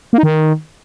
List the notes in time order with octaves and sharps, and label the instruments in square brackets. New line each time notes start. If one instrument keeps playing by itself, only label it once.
[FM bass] A#3
D#4
D#3